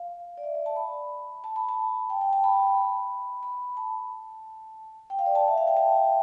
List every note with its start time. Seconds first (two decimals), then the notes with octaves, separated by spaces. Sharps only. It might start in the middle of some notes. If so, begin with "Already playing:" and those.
Already playing: F5
0.37 D5
0.43 E5
0.55 D5
0.66 A5
0.76 B5
1.44 A5
1.56 B5
1.69 A5
2.10 G5
2.21 G5
2.33 A5
2.44 B5
3.43 B5
3.77 A5
5.10 G5
5.19 F5
5.26 D5
5.35 A5
5.48 E5
5.58 F5
5.67 G5
5.77 A5